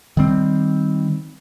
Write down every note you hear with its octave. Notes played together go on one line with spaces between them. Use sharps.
D#3 G3 C4